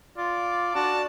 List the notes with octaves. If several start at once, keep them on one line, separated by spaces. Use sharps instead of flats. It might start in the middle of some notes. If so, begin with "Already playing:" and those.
F4 D5
D4 F#4 A5